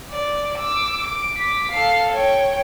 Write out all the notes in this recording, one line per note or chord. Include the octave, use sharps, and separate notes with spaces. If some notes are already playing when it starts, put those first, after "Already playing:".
D5
D6 E6
D7
D6 B6
A4 F5
C#5 G5